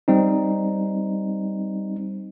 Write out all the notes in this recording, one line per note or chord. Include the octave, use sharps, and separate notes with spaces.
G3 C4 D#4